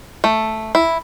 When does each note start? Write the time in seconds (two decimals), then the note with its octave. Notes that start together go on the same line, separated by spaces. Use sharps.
0.24 A3
0.75 E4